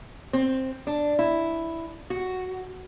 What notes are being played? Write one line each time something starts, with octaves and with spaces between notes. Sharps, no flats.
C4
D4
E4
F#4